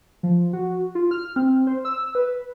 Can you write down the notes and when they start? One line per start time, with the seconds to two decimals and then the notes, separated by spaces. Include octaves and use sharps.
0.23 F3
0.53 F#4
0.95 F4
1.11 F6
1.36 C4
1.67 C5
1.85 E6
2.15 B4